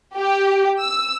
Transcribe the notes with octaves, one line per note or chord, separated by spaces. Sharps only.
G4
E6